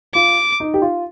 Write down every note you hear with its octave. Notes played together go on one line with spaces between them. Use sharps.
F4 D6
D#4
G4
F4